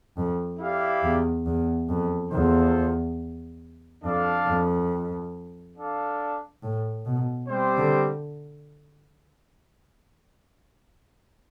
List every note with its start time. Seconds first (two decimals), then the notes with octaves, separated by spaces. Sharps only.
0.17 F2
0.60 E4 G4 D5 F5
1.03 E2
1.46 E2
1.89 F2
2.32 E2 F4 A4 C5
4.04 F2 D4 A4 D5 F5
4.47 F2
5.77 D4 A4 D5 F5
6.63 A2
7.05 B2
7.49 G3 C4 G4 C5
7.78 D3